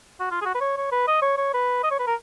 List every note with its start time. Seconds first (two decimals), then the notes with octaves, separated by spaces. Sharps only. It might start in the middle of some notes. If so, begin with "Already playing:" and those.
0.20 F#4
0.31 F4
0.42 G#4
0.46 F#4
0.55 B4
0.61 C#5
0.77 C#5
0.92 B4
1.08 D#5
1.22 C#5
1.38 C#5
1.54 B4
1.84 D#5
1.91 C#5
1.99 B4
2.07 A#4